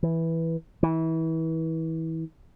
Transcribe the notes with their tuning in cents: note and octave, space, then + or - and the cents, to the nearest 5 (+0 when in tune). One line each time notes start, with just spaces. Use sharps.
E3 -5
E3 -30